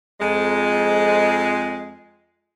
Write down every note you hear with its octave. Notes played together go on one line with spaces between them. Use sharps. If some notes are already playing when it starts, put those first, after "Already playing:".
F2 G#3